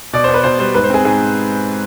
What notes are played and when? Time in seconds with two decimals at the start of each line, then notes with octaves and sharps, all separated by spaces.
0.13 B2 D5
0.24 C5
0.28 B3
0.34 B4
0.44 B2 C5
0.59 G3 C5
0.74 G#2 B4
0.84 C5
0.90 C4 G#4
1.04 G#2 G#4